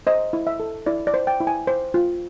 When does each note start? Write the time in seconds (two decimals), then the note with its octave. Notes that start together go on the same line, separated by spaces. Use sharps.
0.07 C5 D#5
0.33 E4
0.47 E5
0.60 A4
0.86 E4 D5
1.07 D5
1.14 C5
1.27 G5
1.40 E4
1.47 G#5
1.67 C5
1.94 F4